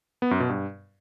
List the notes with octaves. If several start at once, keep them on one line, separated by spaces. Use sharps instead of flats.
B3
F#2
B2
G2